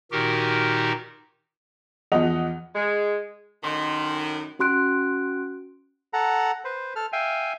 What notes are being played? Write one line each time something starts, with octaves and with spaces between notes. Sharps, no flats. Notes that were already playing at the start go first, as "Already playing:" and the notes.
A#2 D#3 D#4 F#4 G4 A#4
E2 F3 D#5 F#5 F7
G#3
F#2 A2 D#3 G#5 C6
C#4 F#4 C6 F#6 D7
A4 F#5 A#5
B4 C5
A4 F6
E5 F5 G5 G#5